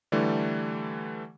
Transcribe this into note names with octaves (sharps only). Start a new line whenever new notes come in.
D3 E3 G3 A3